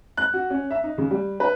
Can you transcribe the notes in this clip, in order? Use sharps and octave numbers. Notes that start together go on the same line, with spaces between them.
F#6
F#4
C#4
E5
D#4
C#3
G3
B4